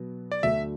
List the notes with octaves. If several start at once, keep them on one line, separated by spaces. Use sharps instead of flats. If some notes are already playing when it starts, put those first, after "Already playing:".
Already playing: B2 F#3 B3
D5
D2 D3 A3 D4 F#4 E5